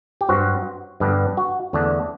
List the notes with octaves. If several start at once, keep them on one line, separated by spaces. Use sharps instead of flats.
G4
G2 F#3 C4 F#4
G2 D3 G3 B3 D4
F#4
E2 D3 A3 D4